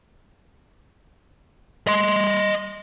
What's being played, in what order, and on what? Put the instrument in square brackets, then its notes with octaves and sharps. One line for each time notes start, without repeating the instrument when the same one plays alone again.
[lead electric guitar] D#5 C6